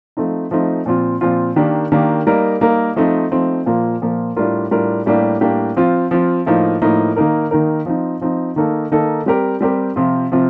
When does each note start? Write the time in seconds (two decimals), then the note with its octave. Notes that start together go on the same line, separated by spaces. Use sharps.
0.17 F3 A3 C4 D#4
0.51 F3 A3 C4 D#4
0.86 A#2 F3 C4 F4
1.21 A#2 F3 C4 F4
1.56 D#3 A#3 D4 G4
1.92 D#3 A#3 D4 G4
2.27 G3 A#3 D#4 A#4
2.61 G3 A#3 D#4 A#4
2.96 F3 A3 C4 D#4
3.31 F3 A3 C4 D#4
3.66 A#2 F3 A#3
4.02 A#2 F3 A#3
4.36 A2 G3 D4 F4 A#4
4.71 A2 G3 D4 F4 A#4
5.06 A2 G3 A#3 D4 G4
5.41 A2 G3 A#3 D4 G4
5.77 F3 C4 F4
6.11 F3 C4 F4
6.46 A2 F3 A#3 D#4
6.82 A2 F3 A#3 D#4
7.16 D#3 A#3 D#4 A#4
7.51 D#3 A#3 D#4 A#4
7.86 F3 C4 D#4
8.21 F3 C4 D#4
8.56 D#3 A#3 D#4 A4
8.91 D#3 A#3 D#4 A4
9.26 G3 C4 G4 A#4
9.61 G3 C4 G4 A#4
9.96 C3 F3 C4 F4
10.32 C3 F3 C4 F4